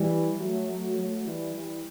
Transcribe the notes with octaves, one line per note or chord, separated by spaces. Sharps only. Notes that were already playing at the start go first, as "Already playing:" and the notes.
Already playing: E3 G3
F#3 A3
F#3 A3
F#3 A3
E3 G3
E3 G3